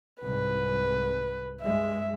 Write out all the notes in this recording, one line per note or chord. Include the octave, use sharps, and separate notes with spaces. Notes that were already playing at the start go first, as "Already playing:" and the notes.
C2 G#2 B4
G2 G#3 E5